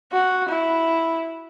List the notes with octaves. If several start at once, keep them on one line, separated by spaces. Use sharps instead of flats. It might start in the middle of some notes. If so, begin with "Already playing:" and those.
F#4
E4